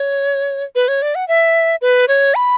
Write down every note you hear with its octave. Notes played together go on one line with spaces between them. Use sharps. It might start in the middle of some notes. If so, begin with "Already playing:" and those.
Already playing: C#5
B4
C#5
D5
F#5
E5
B4
C#5
B5